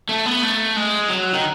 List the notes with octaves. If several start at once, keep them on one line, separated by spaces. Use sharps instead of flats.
A3
B3
A3
G#3
F#3
D#3